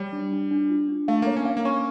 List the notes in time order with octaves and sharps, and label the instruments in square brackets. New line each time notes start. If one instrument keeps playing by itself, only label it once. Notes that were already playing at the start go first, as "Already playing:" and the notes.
Already playing: [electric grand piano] G3 [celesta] C#5
[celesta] D4
D4
D4
F4
D4
[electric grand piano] A3 [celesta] F5
[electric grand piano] A#3 [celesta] C#5
[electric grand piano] C#4
[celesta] F5
[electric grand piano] A#3
[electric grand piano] C#4 [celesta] C#6